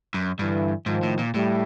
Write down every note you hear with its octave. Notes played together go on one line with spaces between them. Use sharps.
F#2
G2 D3 E3
G#2 D#3 F3
A2
A#2
A2 G3 A3